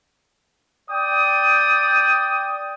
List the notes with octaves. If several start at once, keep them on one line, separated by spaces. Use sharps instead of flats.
D5 G5 D#6